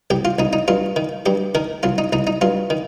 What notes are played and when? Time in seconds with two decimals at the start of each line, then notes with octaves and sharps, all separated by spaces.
0.10 C2 G4
0.25 F4
0.39 C2 D#4
0.53 D#4
0.68 G2 F4
0.96 D#3
1.26 G2 G4
1.55 D#3 A#4
1.83 C2 F4
1.98 D#4
2.13 C2 D#4
2.27 D#4
2.41 G2 F4
2.70 D#3